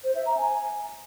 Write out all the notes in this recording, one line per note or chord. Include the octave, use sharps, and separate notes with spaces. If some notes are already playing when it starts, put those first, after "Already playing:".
C5
E5
A#5
G#5